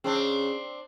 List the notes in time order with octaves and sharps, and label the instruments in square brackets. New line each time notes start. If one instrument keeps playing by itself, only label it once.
[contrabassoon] C#3 [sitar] C4 D4